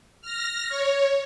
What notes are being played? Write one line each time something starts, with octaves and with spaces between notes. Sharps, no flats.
F6 A#6
C#5